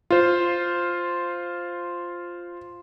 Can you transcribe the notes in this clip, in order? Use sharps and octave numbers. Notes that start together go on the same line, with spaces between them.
F4 C5